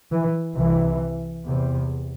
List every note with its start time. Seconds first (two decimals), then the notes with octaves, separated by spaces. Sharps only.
0.11 E3
0.56 C2 C3 E3
1.44 E2 C3